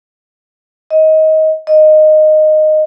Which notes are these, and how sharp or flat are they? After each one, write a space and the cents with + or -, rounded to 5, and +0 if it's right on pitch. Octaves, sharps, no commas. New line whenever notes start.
D#5 +20
D#5 -10